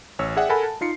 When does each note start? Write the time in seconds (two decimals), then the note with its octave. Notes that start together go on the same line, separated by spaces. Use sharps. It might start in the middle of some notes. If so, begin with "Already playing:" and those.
0.19 A1 C#5 E6
0.37 G#4 D5 E5 F#5 G5
0.49 A4 A#4 F#5 G#5 B5
0.63 A5
0.81 D#4 F4 C7 C#7